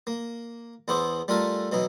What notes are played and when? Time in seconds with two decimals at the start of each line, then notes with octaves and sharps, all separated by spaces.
0.07 A#3
0.88 E2 B3 E4 G#4 C5 D6
1.28 G3 A3 F4 A4 A#4 G#5
1.72 B2 E3 F#3 D#4 E4